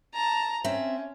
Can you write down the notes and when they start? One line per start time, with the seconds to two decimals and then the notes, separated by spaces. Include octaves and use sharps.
0.14 A5 A#5
0.64 C4 C#4 E5